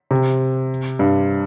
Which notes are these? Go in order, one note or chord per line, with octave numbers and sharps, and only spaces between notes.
C3
G2